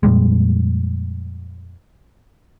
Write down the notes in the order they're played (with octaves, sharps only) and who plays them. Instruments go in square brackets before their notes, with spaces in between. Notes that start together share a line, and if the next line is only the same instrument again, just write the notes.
[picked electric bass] F2 A#2 G3 G#3